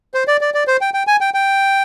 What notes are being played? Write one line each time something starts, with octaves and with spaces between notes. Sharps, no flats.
C5
D5
D5
D5
C5
G5
G5
G#5
G5
G5